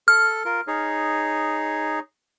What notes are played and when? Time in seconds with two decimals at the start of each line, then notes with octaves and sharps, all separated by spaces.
0.08 A4 F6
0.45 F4 A#4
0.67 D#4 G#4 C#5